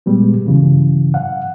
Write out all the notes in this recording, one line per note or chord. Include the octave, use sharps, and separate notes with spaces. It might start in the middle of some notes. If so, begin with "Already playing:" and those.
A#2 G3 G#3 B3
G2 C#3 E3 F#3
F5 F#5